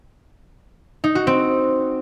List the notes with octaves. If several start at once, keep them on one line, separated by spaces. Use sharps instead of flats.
D#4
F#4
C4